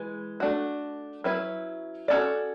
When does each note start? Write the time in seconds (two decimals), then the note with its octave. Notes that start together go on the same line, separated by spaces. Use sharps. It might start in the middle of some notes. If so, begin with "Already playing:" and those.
Already playing: E3 G#3 B4
0.40 A3 D4 F#4
1.24 F#3 C#4 E4 B4
2.08 C#4 F#4 A4 D5